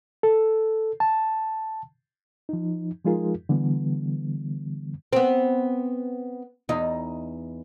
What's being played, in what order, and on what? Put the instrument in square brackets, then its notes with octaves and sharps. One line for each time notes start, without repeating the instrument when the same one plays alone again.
[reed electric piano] A4
A5
F3 D#4
F3 G#3 D#4 F4 G#4 A#4
D3 E3 G3 B3
[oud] B3 C4
E2 D#4